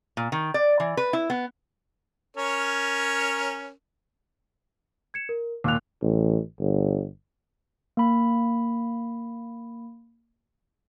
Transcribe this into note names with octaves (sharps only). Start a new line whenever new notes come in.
A#2
D#3
D5
E3
B4
E4
B3
C#4 A#4 C#5
G#6 C#7 E7
A#4
D#2 A#2 D6 E6 F#6 F7
A1
G1
A#3 B5